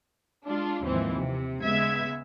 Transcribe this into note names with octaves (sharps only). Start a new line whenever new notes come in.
G#3 D4 F4
D#2 G#2 E3 F3 C4
C3
C#3 G#3 B3 E5 G#6